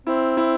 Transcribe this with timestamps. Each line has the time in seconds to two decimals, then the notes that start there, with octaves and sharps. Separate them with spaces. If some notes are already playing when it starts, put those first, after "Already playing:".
0.06 C4 E4
0.37 E4